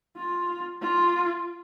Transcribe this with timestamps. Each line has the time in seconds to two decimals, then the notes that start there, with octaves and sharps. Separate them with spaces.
0.16 F4
0.82 F4